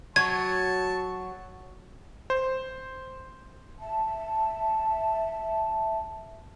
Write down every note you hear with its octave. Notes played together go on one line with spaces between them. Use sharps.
F#3 A5 C#6 G#6
C5
E5 A5